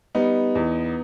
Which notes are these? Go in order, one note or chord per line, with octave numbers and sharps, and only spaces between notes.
G3 B3 D#4
E2